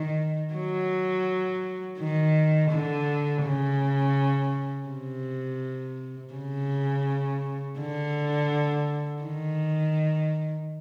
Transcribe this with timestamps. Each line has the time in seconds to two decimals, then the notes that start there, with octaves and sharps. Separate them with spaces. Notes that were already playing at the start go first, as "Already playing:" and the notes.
Already playing: D#3
0.54 F#3
1.99 D#3
2.71 D3
3.43 C#3
4.89 C3
6.34 C#3
7.79 D3
9.23 D#3